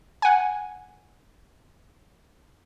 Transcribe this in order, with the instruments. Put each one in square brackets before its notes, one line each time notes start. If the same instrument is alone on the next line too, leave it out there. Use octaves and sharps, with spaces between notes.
[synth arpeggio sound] F#5 G#5